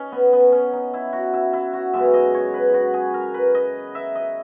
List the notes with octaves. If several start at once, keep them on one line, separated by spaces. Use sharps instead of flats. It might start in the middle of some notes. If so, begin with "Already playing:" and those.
Already playing: C#4 D#4
B3
B3
C#4
D#4
E4
F#4
E4
E4
F#4
F#2 C#3 G#3 B3 E5
D#5
C#5
B4
F#4
G#4
A#4
B4
D#5
E5
D#5